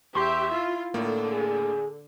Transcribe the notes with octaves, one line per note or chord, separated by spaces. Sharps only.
E2 G4 E5 C6 C#6
E4 F4
A2 D3 A#3
G#4